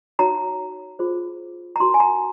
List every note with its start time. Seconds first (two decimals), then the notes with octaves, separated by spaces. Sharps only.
0.19 D#4 F#4 C#5 A#5
0.99 F4 G#4 C5
1.76 A#5
1.80 D#4 F#4 A#4 C6
1.94 G#5
2.00 A#5